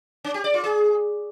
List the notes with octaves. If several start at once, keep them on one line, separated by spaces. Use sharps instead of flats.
C#4
G4
D5
F4
G#4